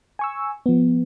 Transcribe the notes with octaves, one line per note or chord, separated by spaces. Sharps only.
G#5 C#6 E6
F3 B3